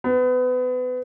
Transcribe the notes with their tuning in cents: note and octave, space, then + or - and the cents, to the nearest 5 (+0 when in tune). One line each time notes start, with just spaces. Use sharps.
B3 +30